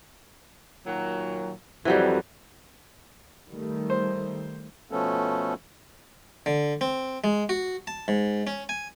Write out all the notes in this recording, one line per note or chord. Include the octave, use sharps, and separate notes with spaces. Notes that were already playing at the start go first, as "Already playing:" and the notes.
A#2 D#3 F#3
F2 E3 F#3 G3
D#3 G3 A3
C5
B2 F3 A3 B3 C#4 A4
D3
C4
G#3
F#4
A5
G#2
C#4
G#5